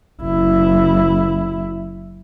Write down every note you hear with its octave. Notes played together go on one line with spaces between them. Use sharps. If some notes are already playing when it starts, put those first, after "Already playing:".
F#1 E4